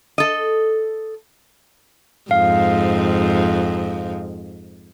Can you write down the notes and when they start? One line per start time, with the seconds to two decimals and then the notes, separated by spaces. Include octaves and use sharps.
0.18 A4 D#5
2.31 F2 G#2 F5